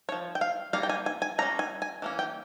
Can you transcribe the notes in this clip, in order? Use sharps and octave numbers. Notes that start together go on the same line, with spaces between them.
F3 C4 C#5
G5
F5
G3 A#3 C#4 F5
G5
G#5
G#5
G#5
G3 A#3 C#4 A#5
G#5
G#5
E3 A#3 C#4
G5